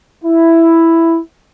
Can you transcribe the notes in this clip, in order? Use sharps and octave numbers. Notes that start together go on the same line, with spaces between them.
E4